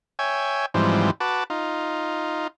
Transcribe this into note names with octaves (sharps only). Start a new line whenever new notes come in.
C#5 E5 G5 G#5
G#2 E3 F3 G3 C4
F#4 B4 A5 D6
D#4 F4